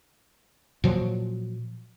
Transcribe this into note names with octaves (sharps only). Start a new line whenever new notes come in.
A#2 F3 F#3